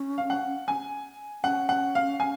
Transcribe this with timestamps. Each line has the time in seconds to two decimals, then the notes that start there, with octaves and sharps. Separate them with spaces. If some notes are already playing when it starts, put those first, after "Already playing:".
Already playing: C#4
0.18 F5
0.30 F#5
0.68 G#5
1.44 C#4 F#5
1.69 F#5
1.95 F5
2.20 G#5